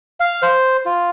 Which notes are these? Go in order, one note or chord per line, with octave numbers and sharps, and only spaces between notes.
F5
C5
F4